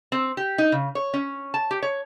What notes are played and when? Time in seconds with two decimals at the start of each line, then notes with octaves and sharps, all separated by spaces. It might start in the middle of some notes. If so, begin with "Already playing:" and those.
0.12 C4
0.37 G4
0.58 D#4
0.72 C#3
0.95 C#5
1.14 C#4
1.54 A5
1.71 G4
1.82 C#5